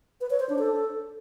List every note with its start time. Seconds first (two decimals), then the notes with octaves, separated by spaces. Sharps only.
0.21 B4
0.30 C#5
0.40 C5
0.49 D4
0.59 A4